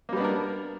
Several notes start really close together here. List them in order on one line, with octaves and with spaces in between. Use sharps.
A#3 G3 B3 D4 A#4